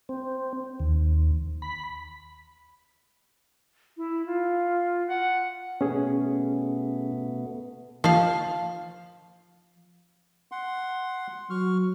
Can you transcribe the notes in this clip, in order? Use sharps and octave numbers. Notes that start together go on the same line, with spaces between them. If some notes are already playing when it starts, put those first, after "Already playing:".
C4
D#2
B5
E4
F4
F#5
B2 A3 B3 C#4 G#4
F3 F5
F#5 C6
F#3 C#6 F6